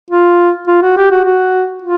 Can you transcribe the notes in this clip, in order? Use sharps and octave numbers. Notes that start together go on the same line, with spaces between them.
F4
F4
F#4
G4
F#4
F#4
F4